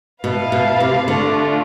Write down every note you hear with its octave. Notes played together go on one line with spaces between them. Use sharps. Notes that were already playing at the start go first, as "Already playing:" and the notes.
B2 E4 B4 F5 A5
B2
C3
D3 A3 D4 F4